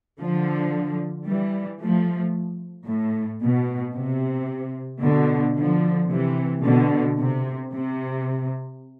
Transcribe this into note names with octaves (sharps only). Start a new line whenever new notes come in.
D3 F3
E3 G3
F3 A3
A2
B2
C3
B2 D3
D3 F3
C3 E3
B2 D3
C3
C3